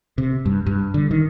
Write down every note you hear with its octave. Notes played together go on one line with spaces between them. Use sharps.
C3
G2
G2
D3
D#3